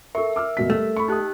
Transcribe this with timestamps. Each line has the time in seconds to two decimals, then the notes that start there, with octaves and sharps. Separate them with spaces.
0.15 A4 A#4 E5 C#6
0.36 D6 E6 F6
0.57 D#1 B2 B6
0.70 G3 A3
0.96 B5 C#6
1.08 D#4 G4 A5 D#6 F#6